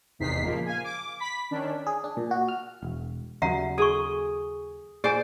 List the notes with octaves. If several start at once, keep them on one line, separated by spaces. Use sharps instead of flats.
G#1 E2 C3 D#4 B6 C7
A#2 C#3 F3 A#3
F5 G#5
D6
B5 B6
D#3 C#4 D4
G#4
D4
A#2
F#4
F6
E1
D#2 C#3 F#3 E5 F#5 A#5
G#4 A4 C#6
A#2 G#4 C5 D5 G#5